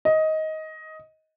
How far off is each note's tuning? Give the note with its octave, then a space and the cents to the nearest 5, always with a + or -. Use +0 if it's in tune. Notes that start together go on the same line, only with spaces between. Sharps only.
D#5 +15